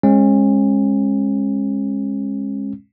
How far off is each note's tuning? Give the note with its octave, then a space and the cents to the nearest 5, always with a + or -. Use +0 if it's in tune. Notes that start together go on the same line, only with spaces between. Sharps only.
G#3 -15 C#4 -35